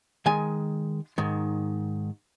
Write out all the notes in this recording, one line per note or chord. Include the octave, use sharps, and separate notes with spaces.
D#3 G#3 G#5
G#2 D#3